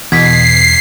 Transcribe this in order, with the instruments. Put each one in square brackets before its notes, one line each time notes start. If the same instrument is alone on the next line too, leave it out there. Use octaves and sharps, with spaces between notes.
[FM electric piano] E2 [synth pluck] B2 [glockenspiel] G#6 B6 [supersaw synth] C7